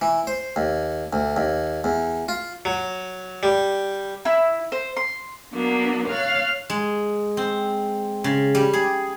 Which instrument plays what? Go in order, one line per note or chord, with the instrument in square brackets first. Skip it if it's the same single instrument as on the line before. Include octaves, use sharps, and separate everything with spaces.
[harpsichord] E3
C5
D#2
D2
D#2
E2
F4
F#3
G3
[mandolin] E4
C5
C6
[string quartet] F#3 A#3 B3 D4
C#5 F5 F6 F#6 A6
[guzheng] G#3
C4
C#3
G3
G#4